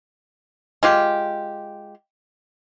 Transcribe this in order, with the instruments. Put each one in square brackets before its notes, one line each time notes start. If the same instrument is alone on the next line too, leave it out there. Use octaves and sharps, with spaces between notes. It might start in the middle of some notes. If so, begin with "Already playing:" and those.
[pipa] G#3 F4 G4